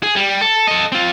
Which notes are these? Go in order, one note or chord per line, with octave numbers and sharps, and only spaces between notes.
G#4
G3
A4
A4 D#5
C4 F4